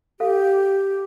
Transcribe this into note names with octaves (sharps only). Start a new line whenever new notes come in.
G4 A4 F5